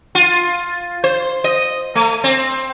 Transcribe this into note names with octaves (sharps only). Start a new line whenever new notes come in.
F4
C5
D#5
A3
C4